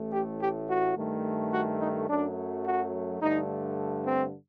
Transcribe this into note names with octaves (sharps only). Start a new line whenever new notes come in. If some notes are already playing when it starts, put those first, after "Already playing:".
Already playing: A1 A2 A3
G4
G4
F#4
G2 D#3 A3
F#4
D#4
F#2 F#3 A3 D4
F#4
G2 D3 A3 D#4
C4